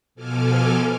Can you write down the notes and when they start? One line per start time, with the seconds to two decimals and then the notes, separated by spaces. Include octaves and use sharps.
0.15 B2 F3 A4 G#5 D6 F6